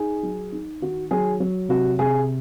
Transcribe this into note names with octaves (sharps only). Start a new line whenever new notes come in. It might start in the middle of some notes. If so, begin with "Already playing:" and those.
Already playing: D#4 G#4
F#3
D#4
D#3 F#4
F#3 G#4
F#3
C3 F#4
C3 G#4